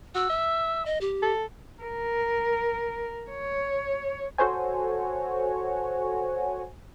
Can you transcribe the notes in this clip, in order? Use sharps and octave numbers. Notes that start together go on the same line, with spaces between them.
F#4 E6
E5
D#5
G4
A4
A#4
C#5
F#4 A4 C5 C#5 G#5